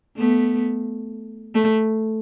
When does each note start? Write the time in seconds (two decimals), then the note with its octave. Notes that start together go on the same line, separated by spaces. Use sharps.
0.17 A3 B3
1.55 A3